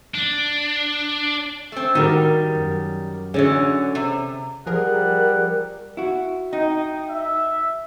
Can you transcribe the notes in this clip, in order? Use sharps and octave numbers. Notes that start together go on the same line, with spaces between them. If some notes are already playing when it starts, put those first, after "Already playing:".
D4
A3 C4
D#3 G3 F#4 G4 A#4
F#2
D3 E3 F#3 C#4 G#4
C3
F3 G3 G#4 A#4 F#5
E4 F#4
D#4 G5
E5